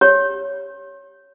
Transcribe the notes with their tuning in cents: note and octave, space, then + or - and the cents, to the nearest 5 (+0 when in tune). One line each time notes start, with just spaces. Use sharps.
G4 +0 C#5 +10